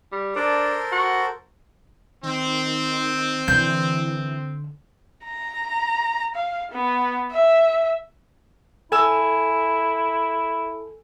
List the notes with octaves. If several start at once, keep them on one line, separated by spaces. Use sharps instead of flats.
G3
D4 A4 A#4 C5
F#4
D#3 C4
D3 E3 G6
A#5
F5
B3
E5
E4 A4 G#5 E6